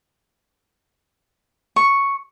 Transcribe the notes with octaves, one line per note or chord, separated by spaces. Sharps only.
C#6